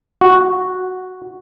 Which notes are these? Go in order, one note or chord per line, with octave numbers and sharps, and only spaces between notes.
F#4